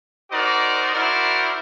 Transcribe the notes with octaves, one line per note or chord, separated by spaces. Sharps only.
D#4 F#4 A#4 C5 D5
E4 F#4 A#4 C5 D5